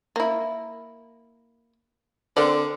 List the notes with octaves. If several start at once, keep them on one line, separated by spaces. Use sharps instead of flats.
A#3 E4
D3 C4 A#4 D5